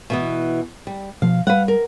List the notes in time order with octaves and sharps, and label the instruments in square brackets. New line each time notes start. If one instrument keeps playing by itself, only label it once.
[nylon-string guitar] B2 E3 B3
G3
[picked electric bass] B2 F3 [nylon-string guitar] F5
[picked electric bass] G3 [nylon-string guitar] B4 F5 F#5
[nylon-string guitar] A#4